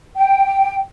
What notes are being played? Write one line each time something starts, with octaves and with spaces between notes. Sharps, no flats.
G5